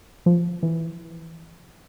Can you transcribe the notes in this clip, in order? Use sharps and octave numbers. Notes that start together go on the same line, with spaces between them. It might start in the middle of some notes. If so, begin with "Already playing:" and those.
F3
E3